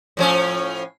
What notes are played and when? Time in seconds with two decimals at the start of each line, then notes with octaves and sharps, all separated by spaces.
0.17 A2 F3 C#4